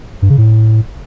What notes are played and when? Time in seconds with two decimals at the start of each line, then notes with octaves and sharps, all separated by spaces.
0.22 G2
0.30 C#3
0.38 A2